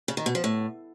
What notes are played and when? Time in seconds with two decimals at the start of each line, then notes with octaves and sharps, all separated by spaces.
0.08 C#3
0.17 D#3
0.26 B2
0.35 F3
0.44 A2